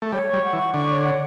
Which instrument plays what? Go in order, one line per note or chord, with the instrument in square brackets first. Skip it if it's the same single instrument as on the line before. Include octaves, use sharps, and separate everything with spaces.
[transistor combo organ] A3
[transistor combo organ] G3 [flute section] C#5
[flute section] C#6
[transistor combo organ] G3
[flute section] F#5
[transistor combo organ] E3
[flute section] C#6
[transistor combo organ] D3 [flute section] C#6
[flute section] C#5
F#5